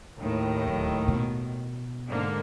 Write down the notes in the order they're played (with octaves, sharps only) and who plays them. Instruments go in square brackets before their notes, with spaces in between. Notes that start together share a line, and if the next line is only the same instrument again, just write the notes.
[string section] D#2 A2 D#3
[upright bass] D1
B2
[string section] G#2 D3 A#3